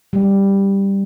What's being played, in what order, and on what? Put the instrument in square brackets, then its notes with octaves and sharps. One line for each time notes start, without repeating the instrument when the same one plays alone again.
[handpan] G3